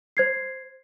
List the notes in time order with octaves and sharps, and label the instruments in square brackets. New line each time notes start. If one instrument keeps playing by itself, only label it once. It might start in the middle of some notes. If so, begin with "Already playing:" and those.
[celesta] C5 G#6 C7